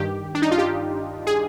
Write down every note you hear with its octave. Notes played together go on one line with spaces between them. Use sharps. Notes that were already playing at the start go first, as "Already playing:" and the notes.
Already playing: G2 D#3 G4
D4
D#4
F4
G4
G#4